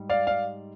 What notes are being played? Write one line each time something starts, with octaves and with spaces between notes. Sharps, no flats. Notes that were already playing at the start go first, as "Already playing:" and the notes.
Already playing: G#2 G3
D5 F5
D5 F5